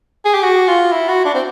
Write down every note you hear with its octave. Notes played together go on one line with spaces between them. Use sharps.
G#4
G4
F#4
F4
E4
F#4
D4
C4